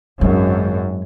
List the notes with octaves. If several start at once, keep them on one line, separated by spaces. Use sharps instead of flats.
G#1 F#2 F#3 C#4